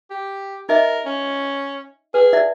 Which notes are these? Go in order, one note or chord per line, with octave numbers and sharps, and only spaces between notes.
G4
D#4 A#4 D#5 E5
C#4
G#4 B4
E4 D5 E5